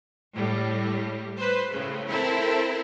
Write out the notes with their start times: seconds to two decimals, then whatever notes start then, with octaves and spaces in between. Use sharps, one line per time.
0.36 A2 G3
1.38 B4 C5
1.71 A2 C#3
2.10 C4 E4 A4 A#4